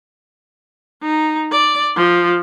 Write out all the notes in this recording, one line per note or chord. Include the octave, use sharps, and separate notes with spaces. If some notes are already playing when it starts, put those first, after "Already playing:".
D#4
D5
F3